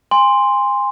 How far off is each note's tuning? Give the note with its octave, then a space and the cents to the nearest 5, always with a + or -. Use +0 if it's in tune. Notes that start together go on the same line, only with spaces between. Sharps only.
G#5 -30 C6 +0